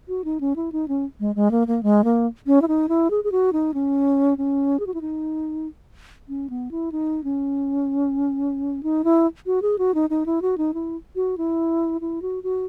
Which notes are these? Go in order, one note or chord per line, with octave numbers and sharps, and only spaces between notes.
F#4
D#4
C#4
E4
D#4
C#4
G#3
G#3
A#3
A#3
G#3
A#3
C#4
E4
D#4
E4
G#4
G#4
F#4
D#4
C#4
C#4
G#4
F#4
E4
D#4
C#4
B3
E4
D#4
C#4
D#4
E4
F#4
G#4
F#4
D#4
D#4
E4
F#4
D#4
E4
F#4
E4
E4
F#4
F#4